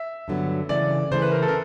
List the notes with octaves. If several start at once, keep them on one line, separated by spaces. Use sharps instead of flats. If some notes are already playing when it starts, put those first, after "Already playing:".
Already playing: E5
G2 D3 F#3 B3
C#3 E3 A3 D5
C#3 E3 A3 C5
B4
A#4
A4
A#4